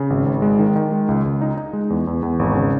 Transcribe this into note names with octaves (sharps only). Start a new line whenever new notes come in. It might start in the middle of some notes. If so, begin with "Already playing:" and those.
Already playing: C#3
G#1
G#1
G#3
D#3
D#3
G#3
C#2
C#2
D#4
D#4
G#3
E2
E2
E2
G#1
C#3